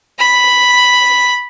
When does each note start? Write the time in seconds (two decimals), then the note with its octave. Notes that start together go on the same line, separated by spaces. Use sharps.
0.18 B5